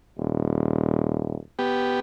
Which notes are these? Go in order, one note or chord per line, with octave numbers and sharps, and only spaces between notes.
D#1
B3 G4